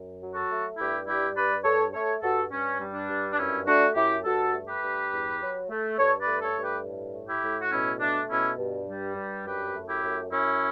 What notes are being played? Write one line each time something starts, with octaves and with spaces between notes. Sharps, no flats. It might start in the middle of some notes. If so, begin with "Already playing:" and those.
Already playing: F#2
F#3
F#4 A4
A3
G2 E4 G4
G3 E4 G4
G2 B4 D5
G2 A4 C#5
A3 A4 C#5
G2 F#4 A4
G2 C#4
G3
D4
G2
D4
F#2 C#4 E4
A3 D4 F#4
F#2 E4 G4
G2 F#4 A4
A3
G4 B4
G2
E2
F#3
A3
G2 A4 C#5
B4 D5
A3
A4 C#5
G2
G4 B4
A2
A3
E4 G4
A2
F#4
B2 C#4 E4
A3 D4
B2 C#4 E4
G2
G3
G2
F#2 G4 B4
A3
E4 G4
F#2
F#2 C#4 E4